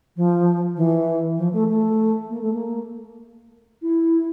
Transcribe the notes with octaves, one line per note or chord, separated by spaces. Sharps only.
F3
E3
F3
A3
A3
A#3
A3
A#3
E4